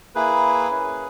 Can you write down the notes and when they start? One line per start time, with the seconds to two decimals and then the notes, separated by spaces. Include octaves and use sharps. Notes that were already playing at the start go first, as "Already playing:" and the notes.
0.15 A#3 E4 G#4 B4
0.71 C#4 G#4